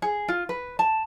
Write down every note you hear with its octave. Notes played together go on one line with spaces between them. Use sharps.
G#4
F4
B4
A5